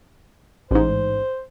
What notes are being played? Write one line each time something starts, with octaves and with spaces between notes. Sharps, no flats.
A1 G#2 C5